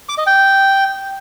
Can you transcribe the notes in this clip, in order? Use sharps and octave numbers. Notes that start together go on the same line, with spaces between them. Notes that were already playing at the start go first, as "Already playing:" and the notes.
D6
D#5
G5